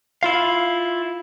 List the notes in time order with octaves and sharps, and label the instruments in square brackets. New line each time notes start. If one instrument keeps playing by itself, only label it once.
[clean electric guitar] E4 F4 F5